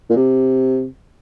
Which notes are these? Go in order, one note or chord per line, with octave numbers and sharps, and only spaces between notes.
A#2
C3